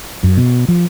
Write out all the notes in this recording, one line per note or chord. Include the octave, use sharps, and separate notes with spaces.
F#2
B2
F3